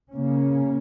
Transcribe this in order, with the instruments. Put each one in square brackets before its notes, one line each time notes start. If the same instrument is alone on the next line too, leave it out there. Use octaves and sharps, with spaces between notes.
[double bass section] C#3 A#3 C#4